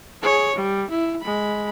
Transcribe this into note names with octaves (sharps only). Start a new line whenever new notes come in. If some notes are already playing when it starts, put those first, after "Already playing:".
G#4 C#5
G3
E4
G#3 B5